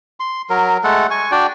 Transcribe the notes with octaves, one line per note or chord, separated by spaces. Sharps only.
C6
F#3 A#4
G#3 A3 A4 F#5
G#5 C#6
D4 F#4 D5 G5